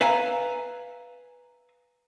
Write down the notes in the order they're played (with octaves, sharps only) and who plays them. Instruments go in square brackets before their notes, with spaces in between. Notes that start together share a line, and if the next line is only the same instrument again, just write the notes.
[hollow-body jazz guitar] B4 E5 F5 G#5 A#5